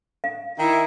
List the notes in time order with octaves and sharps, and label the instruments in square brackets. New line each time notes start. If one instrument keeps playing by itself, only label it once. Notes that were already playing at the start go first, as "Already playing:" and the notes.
[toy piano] F5
[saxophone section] D#3 E4